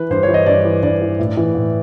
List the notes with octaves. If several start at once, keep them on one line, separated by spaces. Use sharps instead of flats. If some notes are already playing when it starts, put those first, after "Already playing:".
Already playing: E3 B4
G2 C5
C#5
E3
D#5
G2 D5
E3
G2 D5
E3
A2
E3
A2